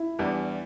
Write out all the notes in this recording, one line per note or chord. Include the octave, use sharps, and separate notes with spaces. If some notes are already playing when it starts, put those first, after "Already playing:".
Already playing: E4
E2 E3 G3 D4